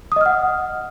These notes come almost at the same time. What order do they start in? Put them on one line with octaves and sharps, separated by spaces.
D#6 D#5 F6 F#5